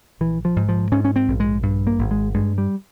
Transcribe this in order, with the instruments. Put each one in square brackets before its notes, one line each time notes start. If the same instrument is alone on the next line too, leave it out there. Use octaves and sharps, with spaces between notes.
[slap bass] A#1 E3
F3
G#2
F3
G#2 C#4
C#4
C4
A#1
G#3
G2
A#3
G#1
G#3
G2 G#3
G3